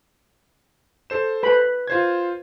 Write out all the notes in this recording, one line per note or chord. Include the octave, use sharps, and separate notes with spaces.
A4 C5 E7
B4 B5
F4 C5 G#6